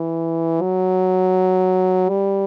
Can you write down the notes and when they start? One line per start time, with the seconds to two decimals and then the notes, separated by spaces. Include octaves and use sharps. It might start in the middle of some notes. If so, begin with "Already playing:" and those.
Already playing: E3
0.61 F#3
2.09 G3